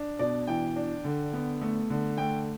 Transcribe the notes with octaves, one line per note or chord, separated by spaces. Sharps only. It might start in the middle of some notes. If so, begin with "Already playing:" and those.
Already playing: D4
B2 D5
E3 G5
D4
D3
B3
A3
D3
A3 G5